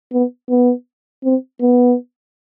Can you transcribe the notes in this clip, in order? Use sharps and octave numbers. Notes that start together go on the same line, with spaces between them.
B3
B3
C4
B3